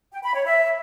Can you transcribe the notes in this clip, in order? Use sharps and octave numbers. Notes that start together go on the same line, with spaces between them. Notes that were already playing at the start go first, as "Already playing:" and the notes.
G5
B5
C#5
E5